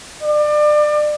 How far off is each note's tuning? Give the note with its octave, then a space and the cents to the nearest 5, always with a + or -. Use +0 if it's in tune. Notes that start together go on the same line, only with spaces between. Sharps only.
D5 +30